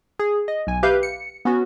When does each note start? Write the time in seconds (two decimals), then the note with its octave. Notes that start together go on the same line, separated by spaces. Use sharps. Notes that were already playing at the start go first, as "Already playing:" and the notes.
0.19 G#4
0.48 D#5
0.67 B1 G#5
0.83 G4 B4 E5 F5 G6
1.03 C#7
1.45 B3 C#4 F#4